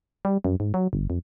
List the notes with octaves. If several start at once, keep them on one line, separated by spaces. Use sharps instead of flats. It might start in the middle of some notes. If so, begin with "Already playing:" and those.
G3
F#2
G#2
F#3
G1
F2